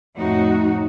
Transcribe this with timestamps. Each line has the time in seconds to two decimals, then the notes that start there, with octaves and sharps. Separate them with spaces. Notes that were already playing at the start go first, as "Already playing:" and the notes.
0.15 F2 A2 D#4 F#4